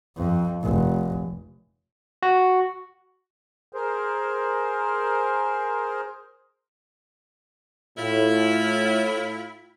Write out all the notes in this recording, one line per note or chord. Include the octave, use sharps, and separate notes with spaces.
F2
F1
F#4
G#4 A#4 C5
A2 E4 F4